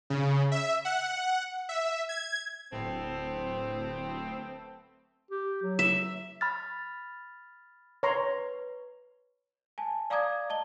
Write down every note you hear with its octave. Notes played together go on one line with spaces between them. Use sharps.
C#3
E5
F#5
E5
G#6
D1 A3 B3 C4
G4
F#3
E5
B5 F6 A6
B4 C#5 A#5 C6
G#5 A5
D5 F5 A#5 D6 D#6 G#6
D#5 A5 G7